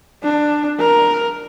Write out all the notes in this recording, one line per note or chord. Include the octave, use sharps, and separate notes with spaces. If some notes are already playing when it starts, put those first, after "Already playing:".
D4
A#4